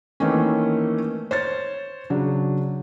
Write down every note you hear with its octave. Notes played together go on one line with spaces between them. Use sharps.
D#3 E3 A3 A#3 C4 C#4
C5 C#5 A6
C#3 F#3 D4